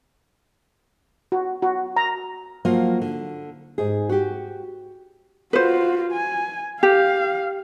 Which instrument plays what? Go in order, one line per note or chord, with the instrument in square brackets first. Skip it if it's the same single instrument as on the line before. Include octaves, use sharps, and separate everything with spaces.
[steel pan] F#4
F#4
A#5
[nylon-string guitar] F3 F#3 A#3 F4
D3
G#2 G#4
F#4 G4
[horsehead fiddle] F4 F#4 [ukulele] B4 C5
[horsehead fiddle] G#5
[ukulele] G4 [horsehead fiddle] F5